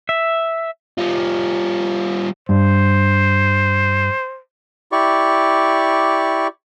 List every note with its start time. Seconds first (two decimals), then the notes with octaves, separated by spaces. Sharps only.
0.09 E5
0.98 G3 F4
2.49 G2 C5
4.92 E4 G4 D5 C#6